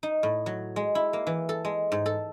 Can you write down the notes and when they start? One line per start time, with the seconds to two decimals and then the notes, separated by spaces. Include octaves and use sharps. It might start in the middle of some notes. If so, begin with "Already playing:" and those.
0.03 D#4
0.23 A2
0.46 F#3
0.76 G#3
0.95 E4
1.13 A#3
1.27 E3
1.49 A4
1.65 G#3
1.92 G#2
2.06 A4